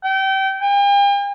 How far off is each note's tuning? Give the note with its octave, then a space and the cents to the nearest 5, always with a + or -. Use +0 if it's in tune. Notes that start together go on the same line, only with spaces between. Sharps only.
G5 -30
G5 +45